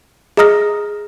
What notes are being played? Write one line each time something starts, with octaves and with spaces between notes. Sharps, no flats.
G#4 D#5 A#5 D#6 F6 A#6